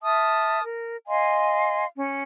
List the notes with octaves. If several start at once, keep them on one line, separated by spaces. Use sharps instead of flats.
E5 A5 D#6 F6
A#4
D#5 F5 G#5 C6
C#4